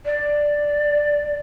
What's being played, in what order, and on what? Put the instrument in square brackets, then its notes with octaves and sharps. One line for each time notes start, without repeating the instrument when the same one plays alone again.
[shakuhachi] D5